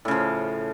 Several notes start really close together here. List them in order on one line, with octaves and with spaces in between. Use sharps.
A2 C#3 F3